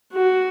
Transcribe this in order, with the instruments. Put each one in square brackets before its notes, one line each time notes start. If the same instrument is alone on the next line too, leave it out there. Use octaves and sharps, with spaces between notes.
[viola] F#4